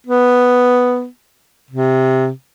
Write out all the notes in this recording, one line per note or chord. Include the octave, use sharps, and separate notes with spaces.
B3
C3